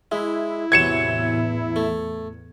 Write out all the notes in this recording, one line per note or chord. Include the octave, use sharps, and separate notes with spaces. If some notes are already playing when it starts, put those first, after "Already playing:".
G#3 E4
E2 A2 C3 E3 F#3 G#6 C#7 E7
A3